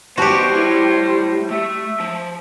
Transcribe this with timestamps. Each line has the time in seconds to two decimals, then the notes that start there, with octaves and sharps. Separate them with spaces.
0.18 G3 B3 F#4 G4 C5 A5
0.52 A2 E4
1.51 A3 E5
2.00 F3